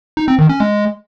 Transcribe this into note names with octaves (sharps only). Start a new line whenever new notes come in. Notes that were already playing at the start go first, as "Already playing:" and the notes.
D#4
C4
D#3
C#4
G#3